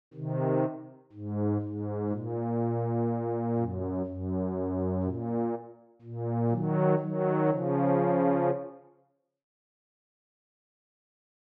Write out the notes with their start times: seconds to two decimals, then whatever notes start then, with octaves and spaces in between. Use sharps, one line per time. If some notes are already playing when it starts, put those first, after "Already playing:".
0.14 C3 D#3
1.13 G#2
1.61 G#2
2.10 A#2
3.57 F#2
4.06 F#2
5.03 A#2
6.02 A#2
6.50 D#3 F#3
6.99 D#3 F#3
7.48 C#3 F3